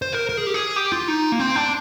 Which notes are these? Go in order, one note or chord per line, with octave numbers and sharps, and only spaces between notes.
C5
A#4
A#4
G#4
G4
G#4
G4
F4
D#4
A#3
C4
D4